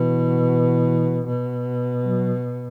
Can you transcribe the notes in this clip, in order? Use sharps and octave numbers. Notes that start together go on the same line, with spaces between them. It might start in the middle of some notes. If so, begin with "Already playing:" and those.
Already playing: B2 E3
B2
F#3